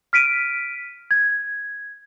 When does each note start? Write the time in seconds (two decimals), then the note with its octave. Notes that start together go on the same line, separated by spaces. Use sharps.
0.13 F6 B6 D7 D#7
1.11 G#6